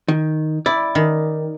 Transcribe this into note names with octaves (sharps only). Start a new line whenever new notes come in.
D#3
E4 D5
D#3